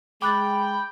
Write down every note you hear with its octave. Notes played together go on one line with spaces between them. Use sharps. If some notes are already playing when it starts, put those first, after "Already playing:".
G#3 G5 B5 D6 F#6 A6